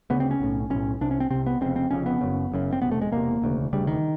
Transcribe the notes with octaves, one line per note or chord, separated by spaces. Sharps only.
D2 C#3 B3
C4
C#4
B1 A2
B1 A2 C#4
C2 C3 D4
C#4
C4
C2 C3 C4
B3
F1 F2 C#3 C4
C4
F1 F2 C#3 C#4
B3
F#1 F#2 C#3
F#1 F#2 C#3
C4
E1 E2 C3 B3
A3
G#3
E1 E2 C3 A#3
E1 D2 C#3
E1 D2 C#3 G3
D#3